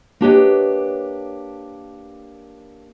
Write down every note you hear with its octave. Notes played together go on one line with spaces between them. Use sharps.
A#3 D4 G4 B4 C#5 D#5